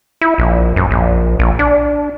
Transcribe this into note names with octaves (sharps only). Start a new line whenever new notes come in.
E4
A#1
F#2
A#1
A#1
D4